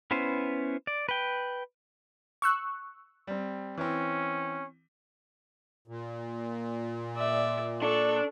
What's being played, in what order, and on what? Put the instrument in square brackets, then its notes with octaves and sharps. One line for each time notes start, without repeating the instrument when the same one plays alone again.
[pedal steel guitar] B3 C#4 E4 B4 C5
D5
B4 G5
[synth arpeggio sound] C#6 E6 F#6
[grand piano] G3 C4
[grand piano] E3 C4 [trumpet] C#4
[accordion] A#2
[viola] D5 E5
[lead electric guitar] D4 [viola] A4 C#6